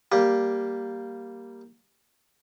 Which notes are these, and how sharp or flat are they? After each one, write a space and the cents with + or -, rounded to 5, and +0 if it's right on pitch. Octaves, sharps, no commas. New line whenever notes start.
G3 +0 A#3 +0 G4 +0